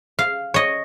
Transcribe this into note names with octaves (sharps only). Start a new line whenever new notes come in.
F5
C#5 D#5